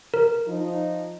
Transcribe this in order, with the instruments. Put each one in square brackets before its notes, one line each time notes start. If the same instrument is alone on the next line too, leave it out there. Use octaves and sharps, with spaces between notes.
[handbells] A#4
[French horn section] F3 D#4